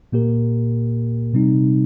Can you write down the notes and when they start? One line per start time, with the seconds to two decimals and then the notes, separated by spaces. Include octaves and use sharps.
0.12 A#2 A#3 G4 A#4
1.34 C3 G3 C4 D#4